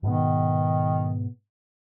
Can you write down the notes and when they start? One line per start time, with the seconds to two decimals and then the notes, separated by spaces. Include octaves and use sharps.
0.03 G#2 B2 D#3 B3